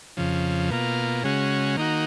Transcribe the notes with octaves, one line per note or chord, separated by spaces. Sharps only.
F2 C#3 F3
B2 A#3 F4
C#3 G#3 C#4 F#4
D#3 A#3 D#4 F#4